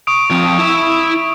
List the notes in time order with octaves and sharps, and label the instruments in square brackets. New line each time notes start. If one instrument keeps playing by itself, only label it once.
[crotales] C#6 D#6 D7
[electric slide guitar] F3 C4
E4 E5